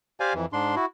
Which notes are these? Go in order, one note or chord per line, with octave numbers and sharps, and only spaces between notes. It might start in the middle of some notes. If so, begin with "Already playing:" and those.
G4 C5 D5 F5 G#5
F2 E3
G#2 D4 C6
E4 F#4